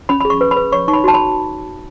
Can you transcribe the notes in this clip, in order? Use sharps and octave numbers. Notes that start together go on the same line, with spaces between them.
C#4 B5
G#4 B5
C#6
B4
B5
B4
C#5 C#6
D#4 C#6
B5
F#4 A5
B5